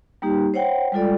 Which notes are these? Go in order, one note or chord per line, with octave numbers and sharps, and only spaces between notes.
G3 A#3 D#4 G4
C5 C#5 F#5 G5
G3 G#3 F4 A4 D5